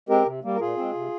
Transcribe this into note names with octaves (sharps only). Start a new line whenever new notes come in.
G#3 C4 G4 A#4
C3
G3 A#3
A#4
A#2 F4 G#4
G#3 C4
C3